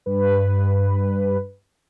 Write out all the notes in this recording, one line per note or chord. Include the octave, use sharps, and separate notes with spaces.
G2 B4